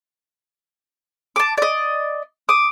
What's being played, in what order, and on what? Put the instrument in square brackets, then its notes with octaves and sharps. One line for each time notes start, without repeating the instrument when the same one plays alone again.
[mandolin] A5 D6
D5 D#5
[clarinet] D6 [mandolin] D#6